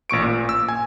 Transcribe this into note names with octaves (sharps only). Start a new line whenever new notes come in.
A1 A#2 C#6 D7
A#2
E6
G#5